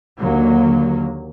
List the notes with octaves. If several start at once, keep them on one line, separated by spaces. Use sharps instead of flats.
D#2 D3 F#3 A#3